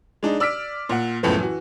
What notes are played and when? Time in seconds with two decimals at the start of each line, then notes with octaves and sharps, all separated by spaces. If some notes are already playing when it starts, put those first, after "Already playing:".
0.23 G#3 D4 D#4
0.40 D5 E6 F6 B6 D7
0.89 A#2 F#5
1.23 F#1 C#2 A2 F3 B3
1.39 E3 F#4